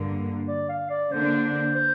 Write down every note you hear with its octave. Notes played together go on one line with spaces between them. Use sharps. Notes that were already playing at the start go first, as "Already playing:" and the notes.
Already playing: G2 D3 A#3
D5
F5
D5
D3 A#3 D4 C5
C5